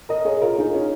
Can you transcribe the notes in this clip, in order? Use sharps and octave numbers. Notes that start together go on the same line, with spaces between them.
A#4 D#5
G#4 C#5
F4 A#4
D#4 G#4
C#4 F4